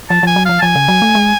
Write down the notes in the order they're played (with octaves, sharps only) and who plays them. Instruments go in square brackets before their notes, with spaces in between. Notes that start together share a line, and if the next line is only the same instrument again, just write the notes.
[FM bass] F3 [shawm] A5
[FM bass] F3 [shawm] G#5
[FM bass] F#3
[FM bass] F3 [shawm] F5
[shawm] A5
[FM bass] F3 [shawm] G#5
[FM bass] C#3
F#3
A3
G#3